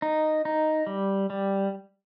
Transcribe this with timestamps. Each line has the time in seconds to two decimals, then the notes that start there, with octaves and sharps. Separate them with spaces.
0.02 D#4
0.45 D#4
0.87 G3
1.30 G3